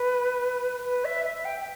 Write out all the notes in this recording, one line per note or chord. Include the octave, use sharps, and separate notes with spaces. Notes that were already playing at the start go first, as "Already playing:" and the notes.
Already playing: B4
B4
E5
E5
G5
G5